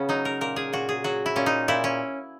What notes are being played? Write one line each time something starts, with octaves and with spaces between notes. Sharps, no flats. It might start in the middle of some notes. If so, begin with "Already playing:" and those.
Already playing: C#3 B3 C#4
F#3 D#4
A#4
A#2 A#4
G#4
A#2 F#4
G#4
F#3 F#4
E4
A#2 C#4
D#4
A#2 E4
C#4